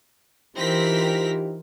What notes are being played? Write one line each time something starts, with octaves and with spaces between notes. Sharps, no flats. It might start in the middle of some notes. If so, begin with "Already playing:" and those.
E3 C4 D#4 F4 G4 A#4 A#6 B6